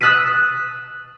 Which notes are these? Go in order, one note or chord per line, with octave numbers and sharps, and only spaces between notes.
D#6 E6 F#6 A6 B6 D#7